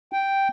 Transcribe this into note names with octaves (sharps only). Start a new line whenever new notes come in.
G5